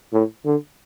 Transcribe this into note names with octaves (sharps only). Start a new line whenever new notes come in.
A2
D3